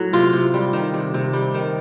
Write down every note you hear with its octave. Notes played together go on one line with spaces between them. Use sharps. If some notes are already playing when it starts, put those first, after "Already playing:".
Already playing: A2 F#3
C3 F4
C3
G3
D#3
C3
C3
G3
D#3